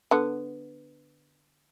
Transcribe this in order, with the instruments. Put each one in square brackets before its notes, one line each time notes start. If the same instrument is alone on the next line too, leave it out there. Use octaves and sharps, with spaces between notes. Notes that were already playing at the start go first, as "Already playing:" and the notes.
[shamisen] D3 B3